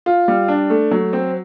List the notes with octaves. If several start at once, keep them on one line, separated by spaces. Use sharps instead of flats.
F4
G3
D4
A3
F#3
C4